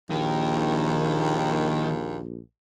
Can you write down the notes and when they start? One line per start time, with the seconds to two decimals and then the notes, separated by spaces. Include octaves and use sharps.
0.10 A#1 D#2 D#3